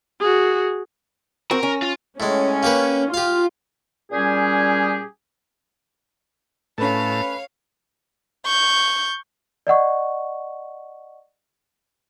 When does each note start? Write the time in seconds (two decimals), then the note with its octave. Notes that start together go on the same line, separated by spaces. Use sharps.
0.20 F#4 G#4
1.51 C4 F#4 A#4
1.63 C#4
1.82 F4
2.20 A2 G#3 C#4
2.63 A#3 G4 B4
3.14 F4 G4 F5
4.12 A#2 G3 C#4 G4 G#4
6.78 A2 A3 C#4 B4 C#5 F5 A5
8.45 C#6 G6
9.67 D5 D#5 F#5 C#6